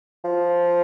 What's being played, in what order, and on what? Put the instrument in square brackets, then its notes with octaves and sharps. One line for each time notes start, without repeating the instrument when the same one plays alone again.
[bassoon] F3